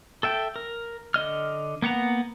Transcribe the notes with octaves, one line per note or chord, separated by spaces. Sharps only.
A4 E5 G5
A#4
D3 D#5 F6
A#3 B3 F#5 A#5